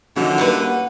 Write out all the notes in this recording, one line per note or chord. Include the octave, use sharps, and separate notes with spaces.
D3 D#3 F3 F#3 C#4 E4 F#4
G3 A#3 B4 C#5 F#5